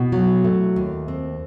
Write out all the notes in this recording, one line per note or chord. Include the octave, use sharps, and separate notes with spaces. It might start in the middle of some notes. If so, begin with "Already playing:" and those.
Already playing: B2 E4
F#3
A3
D#2
C4